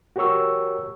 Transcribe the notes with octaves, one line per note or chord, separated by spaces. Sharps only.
F#4 G4 A#4 C#5 C#6 E6